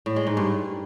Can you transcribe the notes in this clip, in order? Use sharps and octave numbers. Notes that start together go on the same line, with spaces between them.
A2
G#3
G#2
G2